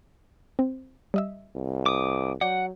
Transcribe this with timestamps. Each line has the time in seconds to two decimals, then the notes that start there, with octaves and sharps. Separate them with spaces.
0.59 C4
1.14 G3 D#5 E5
1.55 C2
1.86 D6 D#6
2.41 F#3 D5 F#5 G6